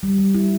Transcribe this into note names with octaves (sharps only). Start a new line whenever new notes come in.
G3
G3
E4